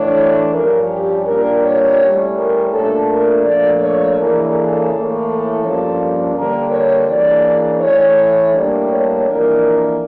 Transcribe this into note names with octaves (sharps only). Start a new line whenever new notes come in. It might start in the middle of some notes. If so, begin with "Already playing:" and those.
Already playing: A2 E3 A3 D4 C#5
G2 F3 C#4 A#4
G4
A#2 G3 D4 A#4
C#5
A2 G3 C#4
A#4
A#2 A3 D4 A4
A#4
A#2 F3 A3 D4 D5
C#5
C#3 E3 A#3 D4 A#4
A4
A2 E3 A#3
A4
G2 F3 A#3 C#4
D3 G3 A#3 A#4
C#5
C#3 E3 A#3 D4 D5
A2 E3 A3 C#5
C#5
A2 G3 A#3 D4
C#5
F2 E3 A#3 D4 A#4